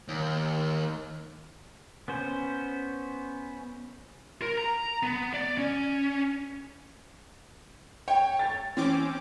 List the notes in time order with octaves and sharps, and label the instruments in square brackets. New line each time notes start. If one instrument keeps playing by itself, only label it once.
[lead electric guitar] D#2
[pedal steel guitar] B3 C#4 C5
[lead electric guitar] A#4
A#5
B3
D5
C#4
[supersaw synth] C#5 [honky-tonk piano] G5
[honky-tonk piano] A6
[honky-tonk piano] E3 [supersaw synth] C4 C#4 D6